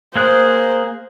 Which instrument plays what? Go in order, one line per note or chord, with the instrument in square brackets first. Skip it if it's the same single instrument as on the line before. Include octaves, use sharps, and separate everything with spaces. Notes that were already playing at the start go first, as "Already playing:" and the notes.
[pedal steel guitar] A#3 G#4 F#6 [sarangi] C5